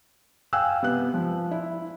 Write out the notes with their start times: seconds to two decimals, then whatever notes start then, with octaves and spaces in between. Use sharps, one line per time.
0.53 F5 G5 G#5 E6 F#6
0.82 C3 B3 F#6
1.14 F3
1.51 E4